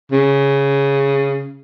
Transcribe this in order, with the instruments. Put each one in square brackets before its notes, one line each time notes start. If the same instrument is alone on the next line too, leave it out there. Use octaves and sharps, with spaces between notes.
[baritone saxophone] C#3